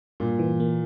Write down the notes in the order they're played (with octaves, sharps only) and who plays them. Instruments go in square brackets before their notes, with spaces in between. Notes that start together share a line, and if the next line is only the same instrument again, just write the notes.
[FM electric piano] G2 [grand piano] A#2
[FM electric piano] E3
A#3